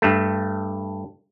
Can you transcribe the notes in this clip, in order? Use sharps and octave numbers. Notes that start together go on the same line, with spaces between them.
G2 A3